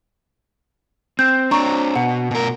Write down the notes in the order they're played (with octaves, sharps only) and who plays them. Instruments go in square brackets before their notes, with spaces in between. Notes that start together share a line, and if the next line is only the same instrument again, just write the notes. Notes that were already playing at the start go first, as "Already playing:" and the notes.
[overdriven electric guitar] C4 [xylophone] G6
[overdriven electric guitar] C4 D4 [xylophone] A#5 C#6
[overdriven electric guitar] B2 [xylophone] F#5
[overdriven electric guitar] B2 A#4